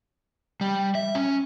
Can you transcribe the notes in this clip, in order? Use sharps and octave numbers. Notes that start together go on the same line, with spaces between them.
G3
E5
C#4